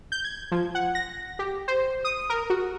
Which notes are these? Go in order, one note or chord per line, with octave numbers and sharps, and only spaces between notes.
G6
G#6
F3
F#5
A#6
G4
C5
D#6
A#4
F#4